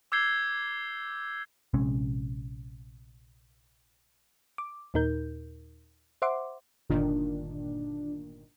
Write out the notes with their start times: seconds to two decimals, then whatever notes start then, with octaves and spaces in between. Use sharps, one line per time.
0.12 D6 E6 G6 G#6 C7 G7
1.74 A#1 C3 G#3 C#4
4.58 D6
4.94 D#2 A#2 D#4 A#4 G6
6.22 C5 E5 F#5 C6 D6
6.89 G1 A#2 D#3 D4